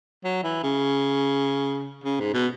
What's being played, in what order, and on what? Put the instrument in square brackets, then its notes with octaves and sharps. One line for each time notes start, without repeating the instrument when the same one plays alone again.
[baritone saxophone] F#3
E3
C#3
C#3
G#2
B2